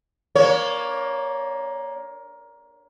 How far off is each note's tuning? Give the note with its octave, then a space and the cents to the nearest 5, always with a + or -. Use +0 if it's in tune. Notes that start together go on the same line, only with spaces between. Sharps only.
A#3 +15 D4 -25 C#5 +0